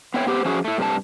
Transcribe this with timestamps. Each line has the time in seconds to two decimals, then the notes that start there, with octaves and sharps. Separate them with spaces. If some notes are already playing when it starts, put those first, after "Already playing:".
0.14 B3 C4 E4 C#5 G5
0.27 B3 G4 C5
0.45 F3 C#4 E4 F#4 G#4
0.65 A3 E4
0.78 G2 C3 A3 A5